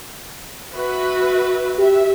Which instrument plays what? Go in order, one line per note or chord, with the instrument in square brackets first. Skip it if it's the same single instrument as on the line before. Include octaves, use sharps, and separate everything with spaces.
[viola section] F#4 B4 E5
[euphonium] G4 [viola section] E5